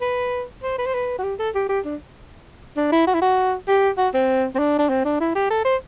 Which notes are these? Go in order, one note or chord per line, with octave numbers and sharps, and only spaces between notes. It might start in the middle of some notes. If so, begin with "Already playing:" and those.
B4
C5
B4
C5
B4
F#4
G4
A4
G4
G4
D4
D4
E4
F#4
E4
F#4
G4
F#4
C4
C4
D4
D4
C4
D4
E4
G4
A4
C5